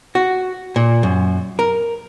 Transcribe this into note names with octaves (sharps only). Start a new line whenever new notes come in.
F#4
A#2
F#2
A#4